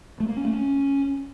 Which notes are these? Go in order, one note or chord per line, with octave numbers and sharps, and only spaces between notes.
A3
A#3
C#4
A3
C#4